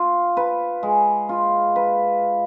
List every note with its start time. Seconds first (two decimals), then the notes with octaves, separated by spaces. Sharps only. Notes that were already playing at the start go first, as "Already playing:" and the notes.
Already playing: F4
0.37 B4
0.83 G#3
1.29 F4
1.76 B4